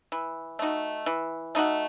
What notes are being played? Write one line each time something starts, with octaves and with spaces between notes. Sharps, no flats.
E3
A3 D#4 F#4
E3
A3 D#4 F#4